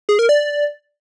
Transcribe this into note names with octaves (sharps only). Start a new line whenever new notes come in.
G#4
A#4
D5